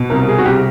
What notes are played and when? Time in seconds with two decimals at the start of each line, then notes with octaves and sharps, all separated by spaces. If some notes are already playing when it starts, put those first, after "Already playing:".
Already playing: B2
0.10 C2 A#4
0.28 G#4
0.39 F#4
0.46 C2 G4